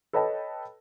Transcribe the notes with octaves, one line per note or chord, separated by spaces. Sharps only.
A4 B4 C#5 D#5 G5 A5